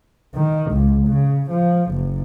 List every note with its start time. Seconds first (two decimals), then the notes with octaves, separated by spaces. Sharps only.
0.35 D#3
0.72 C#2
1.07 C#3
1.51 F3
1.91 F#1